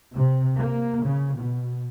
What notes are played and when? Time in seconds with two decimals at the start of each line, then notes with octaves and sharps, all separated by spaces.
0.15 C3
0.58 A#3
1.06 C#3
1.37 B2